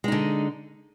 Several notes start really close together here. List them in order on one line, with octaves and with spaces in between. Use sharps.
G#3 D#4 D3